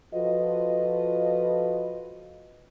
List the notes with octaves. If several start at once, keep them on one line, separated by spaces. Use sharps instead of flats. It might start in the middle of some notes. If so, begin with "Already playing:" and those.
F3 F4 F#4 A4 B4 D#5